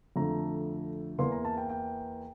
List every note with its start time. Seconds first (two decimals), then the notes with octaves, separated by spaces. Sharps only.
0.16 F2 D3 A3 A#5
1.19 E2 E3 A#3 C6
1.32 A#5
1.45 A5
1.57 G5
1.69 G5